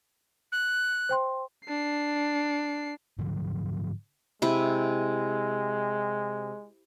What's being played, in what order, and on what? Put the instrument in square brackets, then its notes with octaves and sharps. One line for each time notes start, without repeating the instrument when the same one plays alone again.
[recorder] F#6
[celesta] C5 G5 C6
[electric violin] D4 C7
[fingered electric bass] G#2 D3 F3 F#3
[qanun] C3 E4 [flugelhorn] G#3